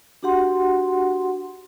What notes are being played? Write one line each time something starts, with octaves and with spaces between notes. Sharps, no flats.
D4 F#4 G4 F#5 C6